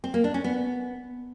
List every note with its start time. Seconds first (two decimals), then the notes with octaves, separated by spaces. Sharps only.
0.04 C4
0.14 A#3
0.24 D4
0.34 C#4
0.44 B3